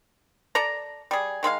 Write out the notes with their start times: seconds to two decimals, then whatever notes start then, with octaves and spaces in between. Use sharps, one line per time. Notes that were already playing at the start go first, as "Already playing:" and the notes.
0.55 A4 D5 A5 A#5
1.11 G3 G#4
1.43 D#3 G#3 E4 F5